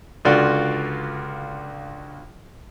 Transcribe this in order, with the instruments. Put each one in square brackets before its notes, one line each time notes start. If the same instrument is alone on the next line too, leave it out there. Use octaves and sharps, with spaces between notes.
[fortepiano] C#2 D3 F4 F#4 D5 C6